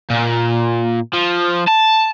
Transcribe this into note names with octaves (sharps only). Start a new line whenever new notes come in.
A#2
F3
A5